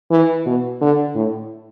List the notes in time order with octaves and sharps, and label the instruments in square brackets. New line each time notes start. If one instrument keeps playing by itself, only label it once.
[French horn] E3
B2
D3
A2